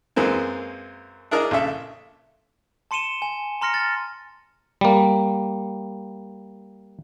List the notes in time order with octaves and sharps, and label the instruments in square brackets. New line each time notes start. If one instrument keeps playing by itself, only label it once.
[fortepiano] F#2 E3 G#3 A#3 C4
D4 E4 G#4 A#4 D#5
A#1 C#3 A4 E5
[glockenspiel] A5 C6 C#7 D#7 E7 G7
G#5
A#5 C6 F6 A#6 C#7
A6
[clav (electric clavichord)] G3 A#3